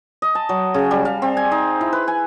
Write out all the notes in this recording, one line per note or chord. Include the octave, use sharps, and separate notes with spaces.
D#5
A5
F#3
C#3
G3
F5
C4
G#5
D#4
E4
B4
G#5